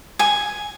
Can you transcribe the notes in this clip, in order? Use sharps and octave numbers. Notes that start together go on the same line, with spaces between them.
G#5